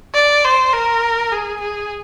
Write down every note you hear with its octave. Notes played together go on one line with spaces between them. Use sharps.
D5
C5
A#4
G#4
G#4